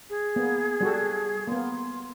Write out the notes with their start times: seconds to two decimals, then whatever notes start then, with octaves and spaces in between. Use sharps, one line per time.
0.10 G#4
0.36 A#3 B3
0.81 G3 F#4 A4
1.47 A#3 B3 C6